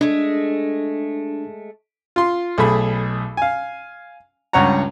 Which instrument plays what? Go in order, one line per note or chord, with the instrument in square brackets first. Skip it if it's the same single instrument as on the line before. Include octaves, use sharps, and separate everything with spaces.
[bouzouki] G#3 A3 [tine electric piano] D4
[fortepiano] F4 C6
B1 A3 G#4 B5
F5 G#5
C#2 G2 C#5 F#5 A#5